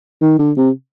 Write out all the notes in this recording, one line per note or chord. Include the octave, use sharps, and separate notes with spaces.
D#3
D3
C3